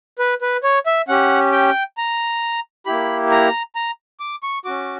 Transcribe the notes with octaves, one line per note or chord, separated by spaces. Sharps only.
B4
B4
C#5
E5
C#4 G4 F#5
G5
A#5
A#3 E4 G4 B5
A#5
A#5
D6
C#6
C#4 F#4 D6